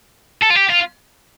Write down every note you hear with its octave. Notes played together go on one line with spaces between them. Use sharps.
A4
F4
G4
F4